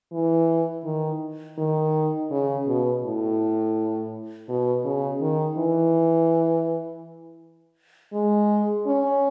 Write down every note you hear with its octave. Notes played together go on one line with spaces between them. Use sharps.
E3
D#3
D#3
C#3
B2
A2
B2
C#3
D#3
E3
G#3
C#4